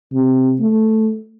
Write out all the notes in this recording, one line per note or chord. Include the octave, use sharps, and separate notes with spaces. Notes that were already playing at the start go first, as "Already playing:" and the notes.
C3
A3